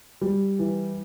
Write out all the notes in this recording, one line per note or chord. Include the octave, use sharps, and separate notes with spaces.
G3
E3